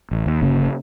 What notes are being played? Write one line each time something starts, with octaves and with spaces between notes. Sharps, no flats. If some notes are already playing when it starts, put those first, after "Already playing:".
A1
D#2
G1 C#3 A#3